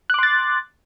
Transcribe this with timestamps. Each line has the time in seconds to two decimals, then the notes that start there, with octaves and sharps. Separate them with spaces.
0.10 F#6
0.14 D6
0.19 C6
0.23 A6